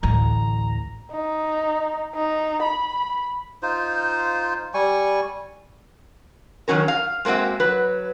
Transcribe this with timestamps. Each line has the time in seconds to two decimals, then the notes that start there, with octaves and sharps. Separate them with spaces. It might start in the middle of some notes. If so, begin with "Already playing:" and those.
0.03 A1 D2 A#5
1.11 D#4
2.15 D#4
2.62 B5
3.62 D#4 F4 C5
4.74 G3 G#5 C#6
6.68 D#3 E3 F#3 C#4 A#4
6.88 F5
7.25 G#3 A#3 C4 F#4 E5
7.60 F#3 B4